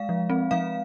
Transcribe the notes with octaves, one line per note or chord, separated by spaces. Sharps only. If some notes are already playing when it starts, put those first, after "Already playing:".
Already playing: G#3 F5
F3
C4
F3 F5